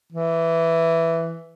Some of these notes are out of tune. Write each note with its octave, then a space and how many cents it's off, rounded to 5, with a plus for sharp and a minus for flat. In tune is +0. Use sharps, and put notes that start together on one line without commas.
E3 +5